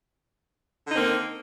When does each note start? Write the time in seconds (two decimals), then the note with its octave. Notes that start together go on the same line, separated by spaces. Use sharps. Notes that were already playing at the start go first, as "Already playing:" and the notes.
0.86 D3
0.90 D#4
0.94 C4
0.98 A#3
1.01 D#3